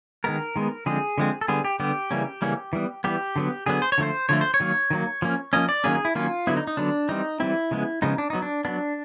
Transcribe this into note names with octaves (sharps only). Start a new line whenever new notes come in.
D#3 G#3 B3 A#4
D#3 G#3 B3
D3 F3 G#3 C4 G#4
D3 F3 G#3 C4
A4
D3 G3 B3 G#4
G4
D3 G3 B3 G4
C#3 E3 G3 A#3 C#4
C#3 E3 G3 A#3 C#4
E3 G3 B3
E3 G3 B3 G4
D3 F#3 B3
D3 F#3 B3 G#4
C5
C#5
D3 F3 A3 C5
D3 F3 A3 C#5
C5
C#5
D#3 F#3 A#3
D#3 F#3 A#3
F3 A#3 C#4
F3 A#3 C#4 D#5
D5
D#3 F#3 A#3 C#4 G#4
G#4
E4
D#3 F#3 A#3 C#4 F4
D3 F#3 B3 E4
D#4
D#4
D3 F#3 B3 D4
E3 G3 C4 D#4
E3 G3 C4 E4
C#3 F3 G#3 B3
C#3 F3 G#3 B3 D#4
D4
F#3 B3 D#4
D4
F#3 B3 D4